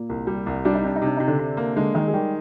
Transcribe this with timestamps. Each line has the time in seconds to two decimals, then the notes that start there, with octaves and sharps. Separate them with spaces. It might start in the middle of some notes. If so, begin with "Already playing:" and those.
Already playing: A#2 A#3
0.09 C2
0.27 G3
0.46 C2
0.65 G3 D4
0.75 D#4
0.83 C3 D4
0.96 D#4
1.02 C3 D4
1.17 C3 D#4
1.27 D3 D4
1.39 C3
1.57 A#3
1.76 D3 G#3 D4
1.95 D#3 G#3 D#4
2.08 G#4
2.13 D#3 G3 G4